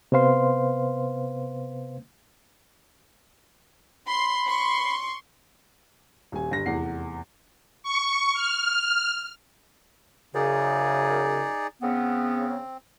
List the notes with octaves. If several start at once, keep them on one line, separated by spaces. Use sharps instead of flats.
C3 B3 B4 C5 F5 C6
B5 C6
C6 C#6
D#1 G#5
G1 A#6
F1 E2 F#5 C7
C#6
F6
F#2 C#3 D#4 G#4 D5
C#3 B3 C4